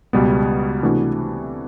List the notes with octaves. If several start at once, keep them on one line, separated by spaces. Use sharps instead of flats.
C#2 B2 G3 B3
C3 E3 A3 D4 F#4